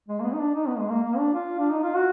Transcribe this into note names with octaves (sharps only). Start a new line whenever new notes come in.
G#3
A#3
B3
D#4
D4
D#4
B3
G#3
A#3
A#3
D4
F4
D4
D#4
F4
F#4